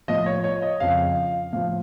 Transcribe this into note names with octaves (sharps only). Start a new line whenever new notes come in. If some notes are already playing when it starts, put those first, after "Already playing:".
A2 F3 D#5
C#5
C#5
D#5
F2 C#3 F3 F5
A2 F3 F5